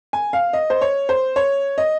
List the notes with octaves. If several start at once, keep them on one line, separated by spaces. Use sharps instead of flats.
G#5
F5
D#5
C5
C#5
C5
C#5
D#5